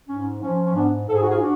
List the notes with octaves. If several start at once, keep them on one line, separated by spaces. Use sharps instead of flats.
G#2 C#4
F3 C#4
C#4
G#2 B3 D4
G#2 A4
G#4
F#4
F4 G#4
D4 F#4